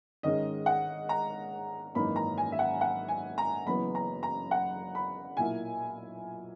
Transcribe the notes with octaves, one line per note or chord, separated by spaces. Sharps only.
G#2 D#3 G#3 C#4 D#5
F#5
A#5
G#1 F#2 E3 A#3 D#4 B5
A#5
G#5
E5
F#5
F#5
G#5
A#5
F#1 F#2 E3 B3 B5
A#5
A#5
F#5
B5
B1 A#2 A#3 E4 G#5